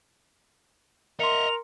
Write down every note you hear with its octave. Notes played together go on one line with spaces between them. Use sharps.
A#4 D#5 E5 C6 C#7 F7